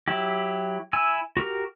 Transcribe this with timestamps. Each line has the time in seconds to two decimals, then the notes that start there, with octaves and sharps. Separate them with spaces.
0.08 F#3 E4 G4
0.93 E4 G#5 E6
1.37 F#4 G4 A#4